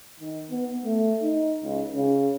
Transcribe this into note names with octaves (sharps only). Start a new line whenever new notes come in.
D#3
B3
A3
D#4
C#2
C#3